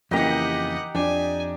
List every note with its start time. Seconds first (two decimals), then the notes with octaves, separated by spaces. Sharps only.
0.11 F2 C#3 E3 A#3 D#4 G4 D#5 F#5
0.95 F2 D4 G#5